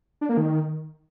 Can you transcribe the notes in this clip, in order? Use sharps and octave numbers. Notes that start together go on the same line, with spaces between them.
D4
A#3
D#3